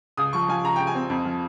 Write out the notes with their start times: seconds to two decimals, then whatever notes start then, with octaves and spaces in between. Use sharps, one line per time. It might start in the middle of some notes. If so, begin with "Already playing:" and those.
0.17 C#2 D#6
0.33 F3 C#6
0.49 F3 G#5
0.64 C#2 A#5
0.76 C#2 G5
0.87 G#5
0.95 C4
1.10 F2
1.25 F3